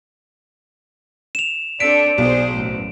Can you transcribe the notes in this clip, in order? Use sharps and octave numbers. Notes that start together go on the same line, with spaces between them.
E7 F7
C4 D4 A4 D5 B6 D7
B1 G#4 C5
A1 F#2